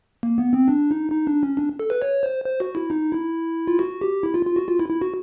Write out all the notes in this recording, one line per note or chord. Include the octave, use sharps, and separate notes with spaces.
A#3
B3
C4
D4
D#4
D#4
D4
C#4
D4
A4
B4
C#5
C5
C5
F#4
E4
D#4
E4
F4
F#4
G4
E4
F4
F4
F#4
F4
E4
E4
F#4